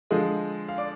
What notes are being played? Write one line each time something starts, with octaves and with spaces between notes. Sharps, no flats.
D3 F3 G#3 D#5
F5
D5